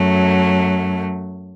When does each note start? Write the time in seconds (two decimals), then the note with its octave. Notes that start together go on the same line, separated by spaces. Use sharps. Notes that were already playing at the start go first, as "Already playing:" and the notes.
Already playing: F#2 F#3 A3